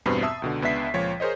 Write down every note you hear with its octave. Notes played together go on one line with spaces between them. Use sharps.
E2 G2 B2 B3 C4 C7
E5 A5 D#6 E6
C#2 B2 D3
C#2 B3 D4 E5 B6 C7
C#2 A#2 F3 C#5
G#4 A#4 C5 C#5 D#5